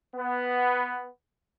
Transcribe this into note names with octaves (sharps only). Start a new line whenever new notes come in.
B3